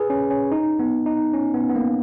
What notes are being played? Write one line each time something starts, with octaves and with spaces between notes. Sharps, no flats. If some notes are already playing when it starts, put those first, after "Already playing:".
Already playing: G#4 B4
C#4
C#4
D#4
B3
D#4
C#4
B3
B3
A#3